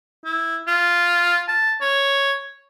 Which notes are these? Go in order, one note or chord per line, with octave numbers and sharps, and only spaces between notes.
E4
F4
A5
C#5